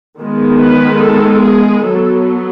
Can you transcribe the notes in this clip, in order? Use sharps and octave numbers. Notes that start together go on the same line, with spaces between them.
D#3 G#3 B3
B4
A4
G#4
F#3 B3 A4